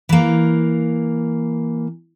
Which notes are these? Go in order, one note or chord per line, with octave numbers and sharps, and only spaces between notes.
E3 A#3